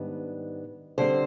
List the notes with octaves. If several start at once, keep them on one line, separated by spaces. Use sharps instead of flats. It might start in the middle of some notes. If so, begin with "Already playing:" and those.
Already playing: G#2 D#3 G3 B3 D4
D3 G3 C4 C5